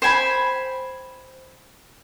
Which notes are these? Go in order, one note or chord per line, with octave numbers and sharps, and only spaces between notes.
C5 G5 G#5 B5